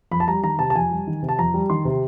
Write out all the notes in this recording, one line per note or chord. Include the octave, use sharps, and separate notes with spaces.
F2 B5
A5
G3 A#5
D#3 A#5
C3 A5
A5
F2 G#5
G3
D#3
C3
A5
F2 A#5
G3
D#3 C6
C3